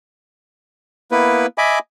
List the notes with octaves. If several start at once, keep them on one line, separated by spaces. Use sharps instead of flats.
A#3 B3 E4 B4
D#5 E5 G#5 B5 D6